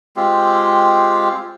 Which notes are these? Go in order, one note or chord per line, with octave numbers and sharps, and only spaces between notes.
G#3 C4 F4 G4